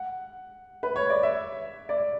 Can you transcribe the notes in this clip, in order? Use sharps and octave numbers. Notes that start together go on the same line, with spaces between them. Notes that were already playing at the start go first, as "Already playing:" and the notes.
Already playing: F#5
B4
C#5
D5
E5
D5